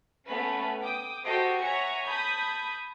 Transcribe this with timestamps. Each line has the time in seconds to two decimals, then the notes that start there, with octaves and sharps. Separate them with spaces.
0.26 A3 B3 C#4 B4
0.82 G5 D6 D#6
1.24 F#4 G4 A4 C5 D#5 G5
1.60 C#5 E5 F#5 G#5 A#5 C#7
2.05 A5 B5 D#6 G6 G#6